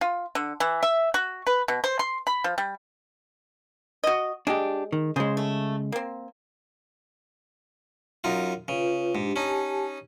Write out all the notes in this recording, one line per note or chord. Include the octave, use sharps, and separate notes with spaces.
F4
D3
E3
E5
F#4
B4
B2
C5
C6
B5
F3
G3
F#4 D#5
G#3 D4 G4
D#3
C#3 G#3 G#4 C5
A3
A#3 C4
F#2 D#4 F4
C#3 F4 B4
G#2 D4 G4
C#4 D#4 G4 G#5 A5